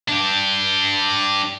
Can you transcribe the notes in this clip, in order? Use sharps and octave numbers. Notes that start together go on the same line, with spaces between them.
D4 G4